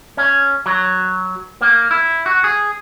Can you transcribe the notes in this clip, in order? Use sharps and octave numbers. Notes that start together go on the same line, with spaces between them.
C#4
F#3
A#3
E4
F#4
G#4